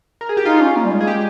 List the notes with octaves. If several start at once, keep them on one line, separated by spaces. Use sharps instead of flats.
A#4
G#4
G4
D#4 F4
C#4
A#3
G3
G#3
G#4
G4